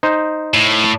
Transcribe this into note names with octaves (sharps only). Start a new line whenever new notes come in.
D#4 C5
A2